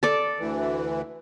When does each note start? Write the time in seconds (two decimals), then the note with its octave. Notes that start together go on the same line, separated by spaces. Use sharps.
0.03 A4 D5
0.39 D2 E3